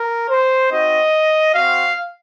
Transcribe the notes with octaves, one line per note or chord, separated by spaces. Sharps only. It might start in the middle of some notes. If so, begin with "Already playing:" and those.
Already playing: A#4
C5
C4 D#4 F#4 D#5
C4 F#4 F5